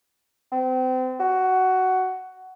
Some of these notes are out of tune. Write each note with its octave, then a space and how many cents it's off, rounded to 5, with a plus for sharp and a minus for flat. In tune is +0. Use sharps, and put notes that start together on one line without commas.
C4 -35
F#4 +10